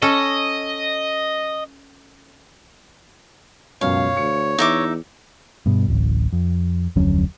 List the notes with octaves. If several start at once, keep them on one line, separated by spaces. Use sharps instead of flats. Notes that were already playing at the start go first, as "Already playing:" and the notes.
C#4 A4 D#5
C#2 F#2 B2 C#5 F5
D2 C#7
E2 D#4 E5 D6
G2 B2
D1 A1
F2
F1 D2 F#3 C#4